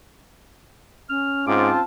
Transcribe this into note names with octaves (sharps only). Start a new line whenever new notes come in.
C#4 F6
G#2 C4 F4 A5 D6